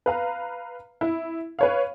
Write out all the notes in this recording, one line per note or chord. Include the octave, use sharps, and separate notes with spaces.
B4 F5 A#5
E4
B4 C#5 F5